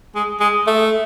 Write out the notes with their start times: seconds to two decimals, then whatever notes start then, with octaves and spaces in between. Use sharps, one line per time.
0.15 G#3
0.40 G#3
0.67 A3